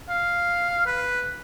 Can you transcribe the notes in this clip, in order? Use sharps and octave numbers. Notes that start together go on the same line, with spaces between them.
F5
B4